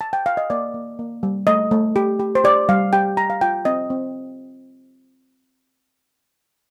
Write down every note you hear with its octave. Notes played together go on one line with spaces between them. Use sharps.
A5
G5
F5
D#5
A#3 D5
A#3
A#3
G3
A3 D#5
A3
G4
G4
C5
G4 D5
G3 F5
G4 G5
G4 A#5
F5
F4 G5
C4 D#5
C4